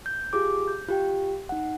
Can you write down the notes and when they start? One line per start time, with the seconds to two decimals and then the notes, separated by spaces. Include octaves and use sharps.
0.06 G6
0.33 F4 G4 G#4 D6
0.68 G6
0.88 F4 G4 G5
1.49 D#4 F#5